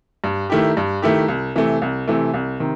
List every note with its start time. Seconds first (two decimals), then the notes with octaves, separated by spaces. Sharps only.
0.24 G2
0.50 D#3 A3 E4 G4
0.77 G2
1.02 D#3 A3 E4 G4
1.28 C2
1.55 C3 E3 A3
1.82 C2
2.08 C3 E3 A3
2.34 C2
2.60 C3 D#3